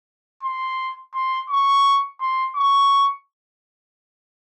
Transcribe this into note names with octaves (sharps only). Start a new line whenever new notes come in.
C6
C6
C#6
C6
C#6